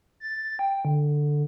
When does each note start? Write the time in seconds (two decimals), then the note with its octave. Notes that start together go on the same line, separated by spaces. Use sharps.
0.20 A6
0.59 G5
0.85 D3